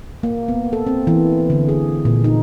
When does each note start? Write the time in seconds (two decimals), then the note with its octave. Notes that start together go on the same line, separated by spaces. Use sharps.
0.23 A#3
0.48 B3
0.73 A4
0.87 C4
1.07 E3
1.50 D3
1.69 G#4
2.05 A#2
2.24 D#4